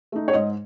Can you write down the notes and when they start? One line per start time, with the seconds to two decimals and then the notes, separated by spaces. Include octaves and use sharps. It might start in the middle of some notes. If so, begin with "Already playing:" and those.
0.12 A3 D#4
0.28 C#5
0.33 G#2 D#5